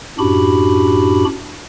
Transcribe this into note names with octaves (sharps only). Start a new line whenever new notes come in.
F#2 A2 D4 F#4 G4 B5